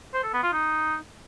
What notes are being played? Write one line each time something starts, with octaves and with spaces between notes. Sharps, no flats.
C5
A4
B3
F4
D#4